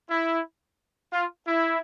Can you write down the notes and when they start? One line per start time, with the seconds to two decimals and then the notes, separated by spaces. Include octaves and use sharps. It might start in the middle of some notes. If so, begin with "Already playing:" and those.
0.09 E4
1.13 F4
1.47 E4